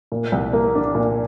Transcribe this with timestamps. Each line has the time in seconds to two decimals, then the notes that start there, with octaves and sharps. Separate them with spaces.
0.12 A#2
0.32 C2
0.53 A#3
0.75 D4
0.95 A#2